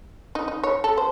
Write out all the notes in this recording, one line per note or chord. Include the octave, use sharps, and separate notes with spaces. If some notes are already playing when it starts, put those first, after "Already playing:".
D#4
D#4
C#5
A4
C5